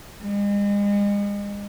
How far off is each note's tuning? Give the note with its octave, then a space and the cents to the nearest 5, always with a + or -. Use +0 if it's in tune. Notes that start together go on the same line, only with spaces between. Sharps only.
G#3 -40